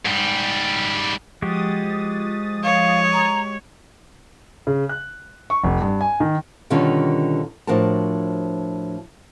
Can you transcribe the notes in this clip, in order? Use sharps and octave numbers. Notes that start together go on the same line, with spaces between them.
G#2 G3
F3 G#3 F#4 G4 D#6 A6
C#5 F5
A#5
C#3
F#6
C#6
F1
G2
G#5
D#3
B2 D3 D#3 G3 C#4 F4
A2 F3 D4 F#4 A#4 A5